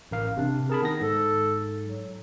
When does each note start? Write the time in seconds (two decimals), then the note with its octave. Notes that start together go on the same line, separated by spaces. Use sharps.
0.11 A1 A#4 F5
0.37 C3 D4
0.70 G#4 A#4 A5 B5
0.82 D#3 B3 A#6
1.01 G#2 A4
1.84 F#3